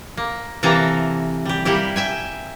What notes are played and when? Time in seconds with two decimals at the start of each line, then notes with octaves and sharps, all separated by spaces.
0.17 A#3
0.63 C3 E3 A#3 A4 A#5
1.45 G3 G4
1.65 G3 A#3 E4 G4
1.96 E5 G5 G#5